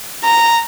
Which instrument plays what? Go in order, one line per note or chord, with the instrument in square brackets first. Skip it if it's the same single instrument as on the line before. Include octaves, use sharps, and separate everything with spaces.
[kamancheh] A#5